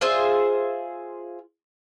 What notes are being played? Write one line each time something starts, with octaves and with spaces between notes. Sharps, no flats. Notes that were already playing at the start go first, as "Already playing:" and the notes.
F4 G#4 C5 E5